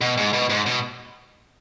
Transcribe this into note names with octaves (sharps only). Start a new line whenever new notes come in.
B2
G#2
B2
G#2
B2